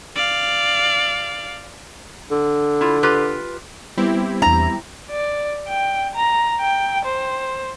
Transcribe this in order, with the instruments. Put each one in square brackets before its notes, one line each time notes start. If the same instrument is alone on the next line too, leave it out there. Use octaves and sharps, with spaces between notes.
[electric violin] D5 F5
[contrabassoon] D3
[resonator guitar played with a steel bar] E4 F4
F4 G4 B4
[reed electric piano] G3 B3 [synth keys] C4 E4 G4
[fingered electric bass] E2 D4 [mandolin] A#5
[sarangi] D5
G5
A#5
G5
C5